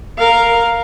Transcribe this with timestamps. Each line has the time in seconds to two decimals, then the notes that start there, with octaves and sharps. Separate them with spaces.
0.18 A#4 F5